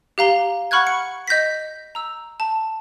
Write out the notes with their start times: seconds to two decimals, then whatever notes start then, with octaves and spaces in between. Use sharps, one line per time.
0.18 G4 F5 A#5 G7
0.71 F#5 B5 C#6 F6 F#6 G#6
0.87 C#7
1.28 D#5 G6 A#6 B6
1.95 A#5 E6
2.40 A5